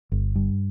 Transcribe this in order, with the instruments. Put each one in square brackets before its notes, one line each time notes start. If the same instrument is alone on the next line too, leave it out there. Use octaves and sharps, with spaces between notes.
[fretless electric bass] G1
G2